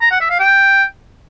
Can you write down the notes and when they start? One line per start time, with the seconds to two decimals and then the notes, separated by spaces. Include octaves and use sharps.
0.01 A#5
0.11 F#5
0.21 E5
0.30 F5
0.40 G5